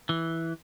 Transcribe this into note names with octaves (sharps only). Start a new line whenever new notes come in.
E3